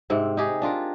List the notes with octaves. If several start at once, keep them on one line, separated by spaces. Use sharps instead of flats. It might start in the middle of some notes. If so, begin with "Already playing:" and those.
G#2 C3 C4
D#4 G4 G#4
D4 F4 A#4